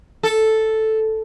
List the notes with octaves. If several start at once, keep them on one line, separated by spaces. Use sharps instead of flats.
A4